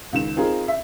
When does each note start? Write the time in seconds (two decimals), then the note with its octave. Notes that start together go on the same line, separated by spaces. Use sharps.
0.13 C#2 D#3 E7
0.36 C4 D#4 F4 G#4 A#4
0.68 E5